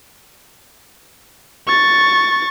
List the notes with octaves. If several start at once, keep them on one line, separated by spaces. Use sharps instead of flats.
C#6 A6